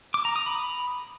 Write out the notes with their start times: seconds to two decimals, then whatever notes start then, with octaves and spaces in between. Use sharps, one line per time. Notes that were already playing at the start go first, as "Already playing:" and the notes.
0.14 D6
0.25 A#5
0.36 D#6
0.46 B5